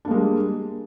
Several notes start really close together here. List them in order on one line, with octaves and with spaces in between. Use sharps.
D4 A#3 G#3 G3